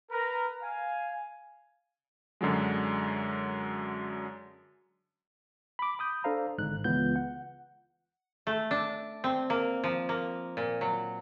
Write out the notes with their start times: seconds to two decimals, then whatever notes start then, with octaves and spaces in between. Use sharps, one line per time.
0.11 A#4 B4 A#5
0.62 F5 G#5
2.41 F#2 D3 F#3 G#3
5.79 B5 D6
5.99 B5 D#6 G6
6.24 D4 A4 C5 F5 A#5
6.58 G#1 G#2 D3 F#6
6.84 C#2 E3 B3 F4 G6
7.16 F#5
8.47 A3
8.71 D4
9.24 C4
9.50 A#3
9.84 F3
10.09 A#3
10.57 A#2
10.81 F#3